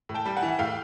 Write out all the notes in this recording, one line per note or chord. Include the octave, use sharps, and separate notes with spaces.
A2
G5 A5
G3
F#5 G#5
E3
F#5
A2 F5 G5